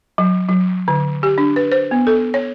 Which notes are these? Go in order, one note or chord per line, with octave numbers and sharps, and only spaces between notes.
F#3
F#3
D3
G4
D4
B4
C5
B3
A4
C#5